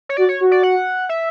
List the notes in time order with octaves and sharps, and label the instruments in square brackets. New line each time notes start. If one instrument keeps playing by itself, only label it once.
[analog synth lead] C#5
[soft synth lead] F#4 [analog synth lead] D5
[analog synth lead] C#5
[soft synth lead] F#4
[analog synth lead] D5
F#5
E5